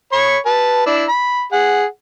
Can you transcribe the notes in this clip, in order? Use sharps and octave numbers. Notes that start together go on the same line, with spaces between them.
C#5 B5 C#6
B4 A5
D4 E4
B5
G#4 F#5